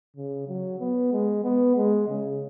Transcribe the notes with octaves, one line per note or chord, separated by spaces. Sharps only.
C#3
F#3
B3
G#3
B3
G#3
C#3